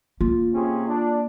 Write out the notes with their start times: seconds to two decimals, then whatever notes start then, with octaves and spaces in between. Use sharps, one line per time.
0.21 A#3 F4
0.53 C3 C#4 G#4
0.87 D4